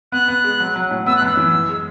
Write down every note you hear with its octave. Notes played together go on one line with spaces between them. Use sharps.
B3 F#6
B3
G#3
F#3
F#3
A2
B3 E6
F#6
F#2 E6
E3
F#2
G#3